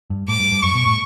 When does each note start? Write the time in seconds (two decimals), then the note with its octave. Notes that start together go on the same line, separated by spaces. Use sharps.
0.10 G2
0.28 A2 D6
0.40 G2
0.52 G2
0.63 F#2 C#6
0.75 B2
0.86 A2